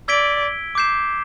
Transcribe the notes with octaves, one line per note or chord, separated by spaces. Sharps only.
D5 E6 G#6 B6 D7 G7
D6 G6 C7 E7